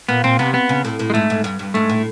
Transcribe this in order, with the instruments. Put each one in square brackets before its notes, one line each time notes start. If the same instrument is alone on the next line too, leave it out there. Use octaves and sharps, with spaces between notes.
[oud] A#2 [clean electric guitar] B3
[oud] A#2 [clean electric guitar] C4
[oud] C3 [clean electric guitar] B3
[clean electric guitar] B3
[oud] C#3
A2
A2
[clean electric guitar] G#3
[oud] G#2 [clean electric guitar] A3
[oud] G#2
G2
G2
[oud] G#2 [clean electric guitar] A3
[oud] A2